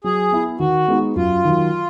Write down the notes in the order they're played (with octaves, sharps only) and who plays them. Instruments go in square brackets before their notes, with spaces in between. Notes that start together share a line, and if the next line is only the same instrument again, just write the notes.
[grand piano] F#3 [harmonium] G#4
[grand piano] B3 E4
[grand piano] D#3 [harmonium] F#4
[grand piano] G#3 B3 D#4
[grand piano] F#2 [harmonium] F4
[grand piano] D#3 F#3